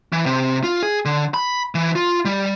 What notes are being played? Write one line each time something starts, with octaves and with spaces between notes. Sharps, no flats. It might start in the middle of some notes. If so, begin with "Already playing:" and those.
E3
C3
F4
G#4
D3
B5
E3
F4
G3